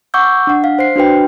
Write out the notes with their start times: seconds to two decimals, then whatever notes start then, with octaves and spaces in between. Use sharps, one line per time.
0.14 F#5 C#6 D6 E6 G6
0.47 D4 F#5
0.64 F5
0.79 C5 C7
0.96 D4 F#4 B4 G5